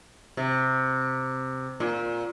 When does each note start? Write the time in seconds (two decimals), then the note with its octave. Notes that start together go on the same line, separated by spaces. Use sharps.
0.37 C3
1.80 A#2